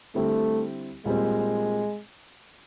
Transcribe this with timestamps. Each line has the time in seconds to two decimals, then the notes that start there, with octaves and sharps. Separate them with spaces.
0.15 D3 G3 A3 C4 E4 G4
1.06 A#2 G3 G#3 C4